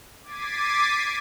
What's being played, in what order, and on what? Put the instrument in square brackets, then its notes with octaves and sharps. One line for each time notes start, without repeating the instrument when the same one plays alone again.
[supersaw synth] D6 G#6 A6 B6 C7 D#7